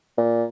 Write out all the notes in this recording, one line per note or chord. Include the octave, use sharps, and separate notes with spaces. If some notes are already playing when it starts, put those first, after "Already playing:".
A#2